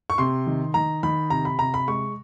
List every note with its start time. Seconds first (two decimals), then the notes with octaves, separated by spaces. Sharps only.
0.10 C#6
0.18 C3 C6
0.47 D#3
0.74 D#3 A#5
1.03 D#3 B5
1.30 C3 A#5
1.45 B5
1.59 C3 A#5
1.74 B5
1.88 G#3 C#6